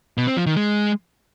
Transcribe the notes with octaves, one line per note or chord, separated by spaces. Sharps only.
B2
C4
F3
D#3
G#3